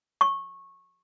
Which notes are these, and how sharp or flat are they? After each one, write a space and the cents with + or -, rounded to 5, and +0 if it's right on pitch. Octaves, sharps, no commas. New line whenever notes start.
C#6 -15